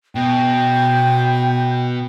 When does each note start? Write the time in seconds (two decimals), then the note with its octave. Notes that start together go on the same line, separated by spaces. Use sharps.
0.15 B2 G5